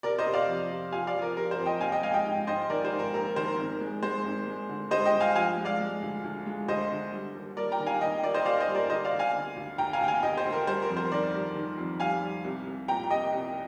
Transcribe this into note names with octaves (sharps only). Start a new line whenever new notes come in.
C3 A#4 D5
C5 D#5
C3
D5 F5
F2
C3
F3 F5 G#5
D5 F5
F3
A#4 D5
C3 A#4
C5
F2
D#5 G5
A#1 F5 G#5
D#5 G5
G#3 F5 G#5
D#5 G5
G#2
G#2 C5 D#5
D#3 A#4 D5
C5
G#2
A#4
A#1 A#4
A#4
D#3 C5
A#4
G#1
G#3
G#3 C5
G#1
G#3
D3
G#3 C5 D#5
D#5 G5
G2
F5 G#5
F3 F5 G#5
G#3
D5 F5
G#3
D2
D2
G#3
D2 C5 D#5
D3
G3
D#2
G3 A#4 D5
G5 A#5
D#3
F5 G#5
D#2 D#5 G5
D#2 A#4 D5
C5 D#5
D#2 D5 F5
C5 D#5
G3
A#4 D5
D3 C5 D#5
D5 F5
D2
F5 G#5
D3
D2
D2 G5 A#5
F5 G#5
D2 G5
F5 G#5
D2 D#5 G5
C5
D2
A#4
G3 C5
A#4
F2
C5
D#3 A#4 D5
G3
D#3
F2
G3 F5 G#5
G3
C2
C2
A#2 G5 A#5
C2 D#5 G5
C2